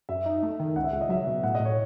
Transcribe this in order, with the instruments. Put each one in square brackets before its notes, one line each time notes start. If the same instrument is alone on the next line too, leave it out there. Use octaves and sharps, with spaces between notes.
[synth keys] F#2 [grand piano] E5
[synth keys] D#4
A3
D#3
[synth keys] C#2 [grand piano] F#5
[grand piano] E5
[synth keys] C#2 [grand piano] F#5
[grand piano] D#5
[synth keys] F#3 [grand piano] E5
[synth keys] B2
[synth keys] A2 [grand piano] F#5
[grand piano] D#5
[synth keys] A2
[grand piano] C#5